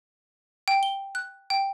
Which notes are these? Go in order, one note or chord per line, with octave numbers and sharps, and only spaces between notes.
G5
G7
F#6
G5